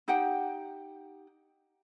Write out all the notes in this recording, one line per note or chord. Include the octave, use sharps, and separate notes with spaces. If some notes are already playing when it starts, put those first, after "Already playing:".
D#4 G4 F#5 G5